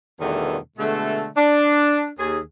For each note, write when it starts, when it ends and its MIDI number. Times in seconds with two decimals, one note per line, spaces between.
0.21 0.57 40
0.21 0.57 47
0.21 0.57 50
0.21 0.57 51
0.21 0.57 55
0.21 0.57 57
0.78 1.27 47
0.78 1.27 50
0.78 1.27 56
0.78 1.27 57
1.36 2.09 62
2.19 2.39 39
2.19 2.39 68